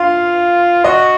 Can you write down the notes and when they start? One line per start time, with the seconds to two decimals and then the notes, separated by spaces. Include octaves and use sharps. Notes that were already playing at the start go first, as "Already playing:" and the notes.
Already playing: F4 F5
0.84 F#4 D#5